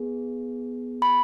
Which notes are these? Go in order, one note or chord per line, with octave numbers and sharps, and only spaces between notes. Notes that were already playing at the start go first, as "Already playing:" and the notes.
Already playing: B3 G#4
B5